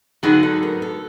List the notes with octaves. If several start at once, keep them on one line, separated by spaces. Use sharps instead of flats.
D3 F#3 B3 D#4 F#4 G#4
A4
A#4
A4